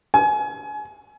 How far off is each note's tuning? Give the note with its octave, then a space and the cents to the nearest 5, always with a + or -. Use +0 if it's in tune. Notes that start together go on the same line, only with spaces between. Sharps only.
G#5 +30